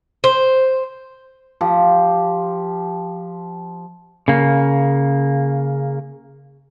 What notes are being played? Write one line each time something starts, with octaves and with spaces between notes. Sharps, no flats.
C5
F3 G4
C#3 A#3